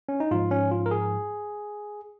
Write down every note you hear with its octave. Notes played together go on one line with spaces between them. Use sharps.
C#4
D#4
G#2 F3 F4
C#4
F4
A#4
G#4